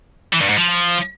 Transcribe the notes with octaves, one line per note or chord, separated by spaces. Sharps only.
E3
G2
G#2
F3